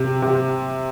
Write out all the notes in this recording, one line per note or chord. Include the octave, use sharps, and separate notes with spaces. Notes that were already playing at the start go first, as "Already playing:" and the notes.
Already playing: C3
C3